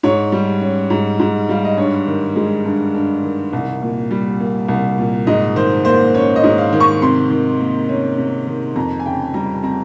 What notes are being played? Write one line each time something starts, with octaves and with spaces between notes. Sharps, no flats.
G#2 C#5
G3
C#4
G#2
G#2
G3 F5
D#5
G2 C#5
D#3
G#3
G2
G2
D#3
C2
A#2
G3
A#3
C2
A#2
G#2 D#5
D#3 C5
A#3 C5
C#4 C#5
D#5
G#2
F5
D#3
C#6
C3 C6
D#3
A#3
C#4
C3
D#3
F2 A#5
G#5
C#3 G5
G3 A#5
C4 A#5